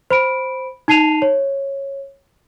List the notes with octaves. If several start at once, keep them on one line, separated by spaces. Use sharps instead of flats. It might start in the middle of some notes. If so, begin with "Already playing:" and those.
C5 B5 D7
D#4 A5 C7 D#7 F7
C#5